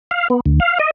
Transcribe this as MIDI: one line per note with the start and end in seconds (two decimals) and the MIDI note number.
0.11 0.28 77
0.30 0.40 59
0.46 0.60 38
0.60 0.78 77
0.79 0.91 75